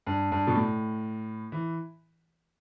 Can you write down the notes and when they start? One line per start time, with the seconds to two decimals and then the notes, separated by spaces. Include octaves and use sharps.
0.07 G2
0.32 G2
0.47 B2
0.55 A2
1.52 E3